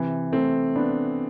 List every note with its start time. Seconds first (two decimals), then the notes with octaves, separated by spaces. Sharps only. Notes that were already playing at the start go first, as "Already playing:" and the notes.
Already playing: C3 E3
0.32 A3 C4
0.76 B3 D4